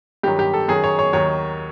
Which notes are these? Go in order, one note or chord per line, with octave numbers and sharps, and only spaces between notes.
G2 D#3 F#3 G4
G4
A4
F#2 D#3 F#3 G#4
C#5
C#5
D#2 D#3 F#3 C#5